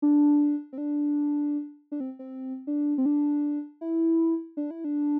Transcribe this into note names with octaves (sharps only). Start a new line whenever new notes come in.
D4
C4
D4
D4
C4
C4
D4
C4
D4
E4
D4
E4
D4